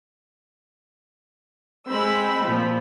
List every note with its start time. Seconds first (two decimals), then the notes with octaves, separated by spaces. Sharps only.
1.88 G#3 C4 B5 E6
2.44 A#2 F3